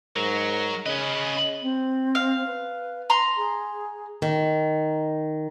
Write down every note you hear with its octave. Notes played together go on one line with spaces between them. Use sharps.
G#2 F#3 A#4
C#3 C#4 B4 D#5
C4
F5
B4
A#5 C6
G#4
D#3